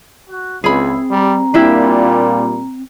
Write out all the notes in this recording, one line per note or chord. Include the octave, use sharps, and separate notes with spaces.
F#4
C#2 C4 E4 G#4 B5
G3 A#5
A#2 G3 D4 E4 G4